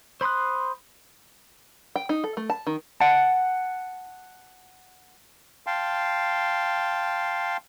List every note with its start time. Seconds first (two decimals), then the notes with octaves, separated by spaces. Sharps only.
0.21 C5 B5 C6 D#6 F#6
1.96 G5
2.09 D#4
2.24 A4
2.37 A3
2.50 A5
2.67 D#3
3.01 F#5 A5
5.67 F5 G5 A5 C6